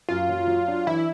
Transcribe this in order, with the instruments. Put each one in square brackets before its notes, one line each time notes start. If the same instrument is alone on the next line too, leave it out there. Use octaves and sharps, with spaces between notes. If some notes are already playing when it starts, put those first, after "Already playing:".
[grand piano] F#2 [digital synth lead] F4
[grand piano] F#3
F#3
D4
[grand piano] E3 [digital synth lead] E4